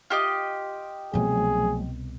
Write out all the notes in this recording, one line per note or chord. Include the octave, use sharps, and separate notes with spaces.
F4 G4 D#5
C2 B2 F3 F#3 A3 G#4